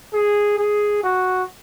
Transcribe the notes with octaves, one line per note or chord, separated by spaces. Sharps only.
G#4
G#4
F#4